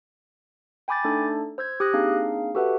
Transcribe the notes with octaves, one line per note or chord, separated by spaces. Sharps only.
G5 G#5 B5 D6 G6 A6
A3 D4 D#4 A4
C5 E6 G6 G#6
G4 D#6 F#6 A#6
A#3 C4 D4 D#4 G#4 F5
F#4 G4 A4 B4 E5 F#5